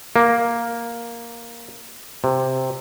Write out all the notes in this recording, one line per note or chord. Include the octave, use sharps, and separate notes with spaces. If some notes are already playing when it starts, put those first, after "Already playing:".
A#3
C3